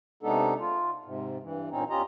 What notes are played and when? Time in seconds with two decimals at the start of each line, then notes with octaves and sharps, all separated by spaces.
0.23 C3 G#3 B3 D4 D#4 A4
0.60 F4
1.05 G#2 C3
1.43 G2 E3
1.71 G2 A#2 C4 C#4 D#4
1.90 E2 C#4 F4 G4 D#5 A#5